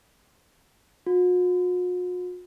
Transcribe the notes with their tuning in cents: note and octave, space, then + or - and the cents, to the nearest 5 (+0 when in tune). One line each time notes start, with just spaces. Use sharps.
F#4 -45